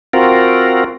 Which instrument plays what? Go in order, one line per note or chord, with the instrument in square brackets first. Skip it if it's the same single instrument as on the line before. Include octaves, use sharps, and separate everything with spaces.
[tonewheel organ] C4 F4 F#4 A#4